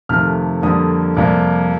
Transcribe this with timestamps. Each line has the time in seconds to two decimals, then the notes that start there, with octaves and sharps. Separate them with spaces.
0.09 F2 C3 D#3 A3 F6
0.62 F2 D3 G3 A#3 D#6
1.16 F2 C3 G3 A#3